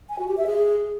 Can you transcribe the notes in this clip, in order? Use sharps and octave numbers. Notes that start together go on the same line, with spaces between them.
G#5
F#4
G4
E5
G#4